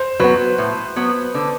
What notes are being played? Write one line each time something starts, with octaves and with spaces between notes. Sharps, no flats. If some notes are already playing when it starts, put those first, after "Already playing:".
Already playing: C5
F#3 B3 B4
A2
F#3 B3
D3